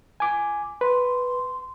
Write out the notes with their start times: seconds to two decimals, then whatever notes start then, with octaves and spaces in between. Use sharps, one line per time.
0.20 G#5 D6
0.81 B4 C6